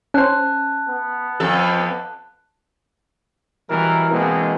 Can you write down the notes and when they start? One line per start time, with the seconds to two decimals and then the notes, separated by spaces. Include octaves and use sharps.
0.14 C#4 C5 A5 F#6
0.88 B3
1.40 F2 A4
3.70 B2 E3 F#3 G3 A#4
4.10 B2 E3 G#3 A#3 C4